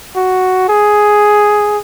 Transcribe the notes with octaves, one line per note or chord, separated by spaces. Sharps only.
F#4
G#4